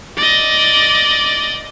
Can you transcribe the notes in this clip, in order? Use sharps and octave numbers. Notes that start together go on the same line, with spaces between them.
D5 D#5